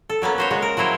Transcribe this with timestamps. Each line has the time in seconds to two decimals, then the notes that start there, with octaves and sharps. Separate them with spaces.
0.10 A4
0.22 F#3 A#3 B3 C#4
0.38 F#4 C5 C#5
0.51 C#3 G#3 F#4
0.62 A#4
0.77 F3 F#3 E4 C5 C#5